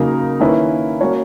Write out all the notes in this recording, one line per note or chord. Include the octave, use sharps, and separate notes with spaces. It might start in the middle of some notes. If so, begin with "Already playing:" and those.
Already playing: C#3 F#3 A#3 D#4 A#4
D#3 A#3 C#4 E4 B4
A#3 C#4 F#4 C#5